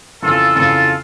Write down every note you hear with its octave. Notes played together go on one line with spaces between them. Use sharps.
F2 C#3 E3 F4 A4
F2 C#3 E3 F4 A4